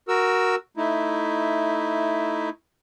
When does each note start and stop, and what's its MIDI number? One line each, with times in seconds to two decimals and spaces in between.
0.08 0.55 66
0.08 0.55 70
0.08 0.55 88
0.77 2.50 57
0.77 2.50 63
0.77 2.50 64